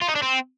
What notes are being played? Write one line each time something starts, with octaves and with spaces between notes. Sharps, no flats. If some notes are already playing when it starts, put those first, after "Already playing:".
F4
D#4
D4
C4